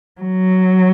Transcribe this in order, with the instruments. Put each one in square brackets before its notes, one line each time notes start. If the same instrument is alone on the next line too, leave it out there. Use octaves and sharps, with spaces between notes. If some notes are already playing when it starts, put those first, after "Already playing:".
[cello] F#3